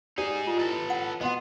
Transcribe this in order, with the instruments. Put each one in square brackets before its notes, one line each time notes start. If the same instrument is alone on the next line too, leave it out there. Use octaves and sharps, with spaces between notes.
[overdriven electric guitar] D#4 G#4 [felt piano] G4 [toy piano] D5
[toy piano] F4
[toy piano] E4 [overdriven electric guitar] A4 B4
[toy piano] F#5
[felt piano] B2 C6 [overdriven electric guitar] B3 [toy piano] D#5 F#5